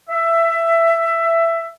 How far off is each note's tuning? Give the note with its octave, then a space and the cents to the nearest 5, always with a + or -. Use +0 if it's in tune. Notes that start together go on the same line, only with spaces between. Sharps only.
E5 +15